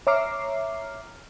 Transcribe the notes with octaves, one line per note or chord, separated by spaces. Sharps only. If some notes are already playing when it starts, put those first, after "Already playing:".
C#5 E5 A#5 D6 F6 C7